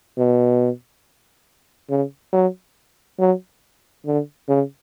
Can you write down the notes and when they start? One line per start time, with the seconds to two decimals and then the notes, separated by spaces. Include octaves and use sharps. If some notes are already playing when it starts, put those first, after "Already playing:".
0.18 B2
1.90 C#3
2.33 F#3
3.19 F#3
4.06 D3
4.48 C#3